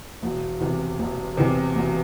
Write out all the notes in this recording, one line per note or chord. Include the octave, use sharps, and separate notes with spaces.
E1
E2 C3
E1
E2 C3
E1